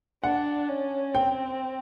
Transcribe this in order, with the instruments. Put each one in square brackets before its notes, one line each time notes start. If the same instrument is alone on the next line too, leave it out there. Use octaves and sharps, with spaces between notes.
[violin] D4 [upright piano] F#5
[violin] C#4
[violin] C4 [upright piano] G5